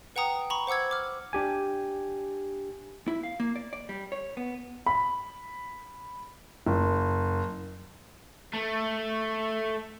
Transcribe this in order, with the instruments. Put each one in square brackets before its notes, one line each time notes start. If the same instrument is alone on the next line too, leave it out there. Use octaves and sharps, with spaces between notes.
[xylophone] B4 F#5 G5 A#5 D#6
A#5 B5 C#6
C5 F#5 D6 E6 G#6
D6 F6
[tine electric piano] D4 G4 G#5
[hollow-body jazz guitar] E4
F5
A#3
D5
D5
G3
C#5
B3
[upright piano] B5
F#1
[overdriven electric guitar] A3